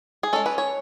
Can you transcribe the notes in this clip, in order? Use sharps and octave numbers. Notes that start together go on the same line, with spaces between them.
G#4
G#3 C#4 A4
B4
C#5